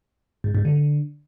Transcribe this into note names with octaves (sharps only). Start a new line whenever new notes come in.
G#2
G#2
D3